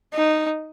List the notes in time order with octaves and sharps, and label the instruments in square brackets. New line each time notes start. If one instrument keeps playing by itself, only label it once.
[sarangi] D#4